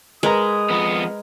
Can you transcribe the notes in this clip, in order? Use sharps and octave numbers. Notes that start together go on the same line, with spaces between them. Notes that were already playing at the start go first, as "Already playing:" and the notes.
G#3 A#4 B4 A#5 D#6
F2 B3